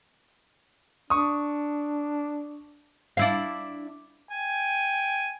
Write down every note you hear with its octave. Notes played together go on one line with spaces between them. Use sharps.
D4 C#6 D#6
D4 E4 F5
G5 G#5